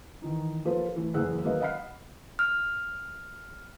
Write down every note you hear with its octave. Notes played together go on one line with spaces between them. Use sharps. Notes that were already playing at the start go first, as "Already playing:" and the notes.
D#3 E3 D#4
F3 A#3 G4 A4 B4 C5
E3 A3
F#1 E2 G#4 F#5 E6 F#6
D#3 F#3 G#3 A#3 B4 D#5
D#5 F5 F#5 B5 F6 C7
F6